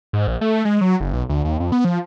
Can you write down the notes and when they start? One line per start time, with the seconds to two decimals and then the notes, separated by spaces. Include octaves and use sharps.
0.13 G#2
0.27 A#1
0.41 A3
0.65 G#3
0.81 F#3
1.00 F#1
1.13 B1
1.29 D2
1.45 D#2
1.60 F2
1.72 B3
1.85 F3